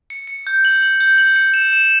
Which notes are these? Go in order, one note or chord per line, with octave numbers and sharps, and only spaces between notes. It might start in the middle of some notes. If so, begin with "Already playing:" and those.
C#7
C#7
G6
F#7
F#7
G6
F#7
C#7
E7
E7